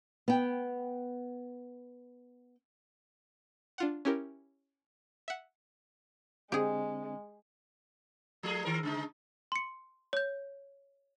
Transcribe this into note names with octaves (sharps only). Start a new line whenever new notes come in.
B3 G5
D4 F4 F#5
C#4 E4 G4 A#4
E5 F#5
D3 G#3 C4 D4 G4 G#4
F3 A3 G#4
D#3 A#4
C#3 G#3 D#4
C6 C#7
C#5 G6